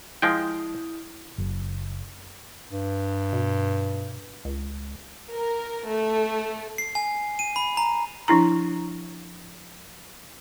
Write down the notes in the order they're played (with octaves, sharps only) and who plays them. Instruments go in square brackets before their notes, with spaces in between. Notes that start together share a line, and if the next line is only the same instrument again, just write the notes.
[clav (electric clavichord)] F3 G#3 G5 [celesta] E4 D#6
[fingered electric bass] F#1
[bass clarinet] G2
[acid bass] B2
C#2
[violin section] A#4
A3
[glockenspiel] C7
G#5
D#7
B5
A#5
[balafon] F3 D4 E4 A#5